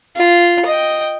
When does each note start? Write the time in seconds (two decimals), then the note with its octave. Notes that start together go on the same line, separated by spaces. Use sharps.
0.16 F4
0.66 D#5 G5